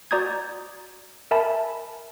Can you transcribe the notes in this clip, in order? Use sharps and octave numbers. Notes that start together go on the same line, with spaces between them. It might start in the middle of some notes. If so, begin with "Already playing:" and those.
F#4 D5 A#5 D#6 G6 G#6
A#4 E5 G#5 A5 B5